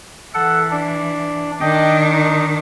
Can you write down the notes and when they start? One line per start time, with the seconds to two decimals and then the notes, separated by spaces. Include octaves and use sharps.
0.34 E3 A4 F#5
0.71 D4
1.61 D#3 D4 D#5 G5
2.13 D#4